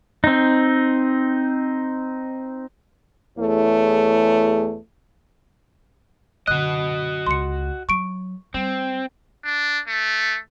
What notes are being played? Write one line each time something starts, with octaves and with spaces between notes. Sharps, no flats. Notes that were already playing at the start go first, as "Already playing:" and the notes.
C4 D#4
E2 A3 E4 G#4 C#5
F#2 D3 F#4 D#5 F#6
C#2 C6 C#7
F#3 C#6 D7
G3 C4
D4
A3